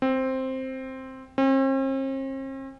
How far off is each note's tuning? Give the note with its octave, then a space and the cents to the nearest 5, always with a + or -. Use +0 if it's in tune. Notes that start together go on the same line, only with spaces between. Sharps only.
C4 +5
C4 +45